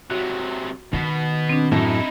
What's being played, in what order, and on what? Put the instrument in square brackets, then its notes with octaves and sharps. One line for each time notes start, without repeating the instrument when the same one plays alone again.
[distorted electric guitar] C3 F#3 [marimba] F#4
[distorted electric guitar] B2 B3 [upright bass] D#3
[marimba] C4 D4
[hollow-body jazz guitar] F#2 A2 [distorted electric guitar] D#4 E4